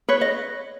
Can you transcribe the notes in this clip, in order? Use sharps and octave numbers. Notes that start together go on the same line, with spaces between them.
B4 C#5
D#5